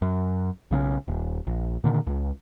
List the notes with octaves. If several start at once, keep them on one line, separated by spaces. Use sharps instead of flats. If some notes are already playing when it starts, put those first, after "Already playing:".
F#2
B1 C#3 C4 C#4
D#1
A#1
A#2 D3 D#3
C#2